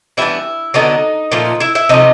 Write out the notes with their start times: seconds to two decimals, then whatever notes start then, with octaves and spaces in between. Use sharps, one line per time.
0.17 E3 G3 B3 D4 E4 E5
0.74 D3 F#3 B3 D4 D#4 D#5
1.32 A#2 F3 A3
1.60 E4 E5
1.75 E4 E5
1.89 C3 F3 A3 D#4 D#5